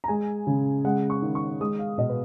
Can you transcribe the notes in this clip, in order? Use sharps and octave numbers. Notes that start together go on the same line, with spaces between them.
A#5
G#3 G#5
C#3
G#3 F#5
C#6
D#3
C#6
G#3 D#6
F5
B2 D#5
B4